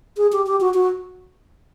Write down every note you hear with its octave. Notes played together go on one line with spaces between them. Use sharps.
G#4
G4
G4
F#4
F#4